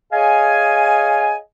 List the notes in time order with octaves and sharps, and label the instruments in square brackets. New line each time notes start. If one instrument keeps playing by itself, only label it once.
[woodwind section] G#4 C#5 D#5 F5 G#5